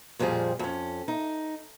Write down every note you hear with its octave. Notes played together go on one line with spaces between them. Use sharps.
F2 A#2 F3 G3 G#4
F2 C#4
D#4